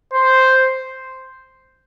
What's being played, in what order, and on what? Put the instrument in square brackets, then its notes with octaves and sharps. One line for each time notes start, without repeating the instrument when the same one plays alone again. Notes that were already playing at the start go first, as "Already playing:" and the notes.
[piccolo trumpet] C5